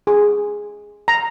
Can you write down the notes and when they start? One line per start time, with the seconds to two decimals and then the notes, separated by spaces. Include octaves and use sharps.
0.07 G#4
1.08 A#5